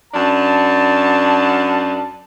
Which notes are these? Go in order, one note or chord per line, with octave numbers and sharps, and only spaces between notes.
F#2 D4 A5